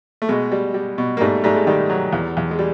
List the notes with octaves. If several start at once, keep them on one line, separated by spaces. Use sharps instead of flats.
A3
B2 G#3
G3
G3
B2
A#3
G#2 G3 A3
G#2 G3 A3
G#3
D#3 G3
F#3
E2
E2
G#3
G3